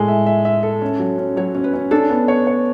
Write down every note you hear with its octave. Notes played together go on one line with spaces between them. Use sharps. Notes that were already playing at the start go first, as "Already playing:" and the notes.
Already playing: A2 G#3 A4 G#5
E5
E5
E5
A4
C#4
F#3
C#4
F#3 C#5
C#4
B4
C#4
D4 A4
B3
C#5
C#5